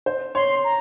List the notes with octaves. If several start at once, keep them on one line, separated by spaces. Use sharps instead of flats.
C5
C#5 C6
A#5